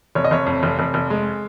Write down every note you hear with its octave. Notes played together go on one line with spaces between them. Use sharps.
F1 C#5
D#5
F1 C#5
F2
F1
F1
F1
G#3